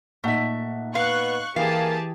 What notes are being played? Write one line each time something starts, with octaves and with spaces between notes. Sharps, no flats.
A#2 A3 D#4 E5 F#5
B3 F5 C#6 F#6
E3 A#3 G4 G#4 F5 A5